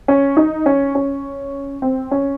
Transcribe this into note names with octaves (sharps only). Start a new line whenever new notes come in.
C#4
D#4
C#4
C#4
C4
C#4